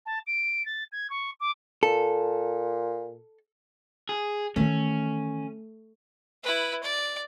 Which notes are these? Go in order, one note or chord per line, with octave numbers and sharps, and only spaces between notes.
A5
D7
A6
G#6
C#6
D6
A#2 A4
G#4
D#3 E3 A3 C#4
E4 B4
D5